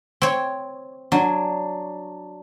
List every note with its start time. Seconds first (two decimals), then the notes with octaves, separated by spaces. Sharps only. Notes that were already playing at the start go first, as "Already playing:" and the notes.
0.22 C4 C#5
1.12 F#3 D4